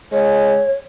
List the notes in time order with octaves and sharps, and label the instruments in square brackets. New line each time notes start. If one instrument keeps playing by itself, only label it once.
[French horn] G#3 [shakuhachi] C#5